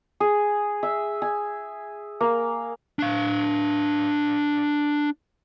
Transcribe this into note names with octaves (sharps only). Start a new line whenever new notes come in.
G#4
E5
G#5
A#3
D4 F5